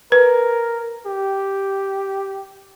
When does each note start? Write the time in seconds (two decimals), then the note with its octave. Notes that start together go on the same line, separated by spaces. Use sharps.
0.12 A#4 B4
1.06 G4